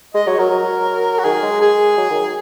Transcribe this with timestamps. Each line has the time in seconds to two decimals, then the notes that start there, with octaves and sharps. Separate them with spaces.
0.14 G#3 D#5
0.27 F#3 C#5
0.39 F#3 A#4
0.51 F#3
1.19 F#4
1.24 D#3 G#4
1.42 G#3
1.61 G#4
1.97 F#3
2.10 D#3